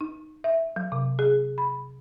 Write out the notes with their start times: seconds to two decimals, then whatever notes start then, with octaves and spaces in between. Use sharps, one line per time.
0.01 D#4
0.44 E5
0.76 F#3
0.92 C3
1.19 G#4
1.58 B5